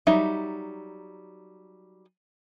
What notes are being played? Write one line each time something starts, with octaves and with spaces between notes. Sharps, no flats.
F#3 G3 D#4 E5